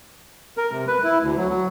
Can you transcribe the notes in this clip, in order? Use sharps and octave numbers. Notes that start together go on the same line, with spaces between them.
A#4
C3
B4
E4
D2
F#3
F#3